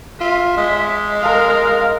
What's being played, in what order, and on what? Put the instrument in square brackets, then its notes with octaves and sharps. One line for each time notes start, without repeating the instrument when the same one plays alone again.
[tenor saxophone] F4 [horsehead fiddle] E5
[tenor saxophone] G#3
[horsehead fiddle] A#4 F5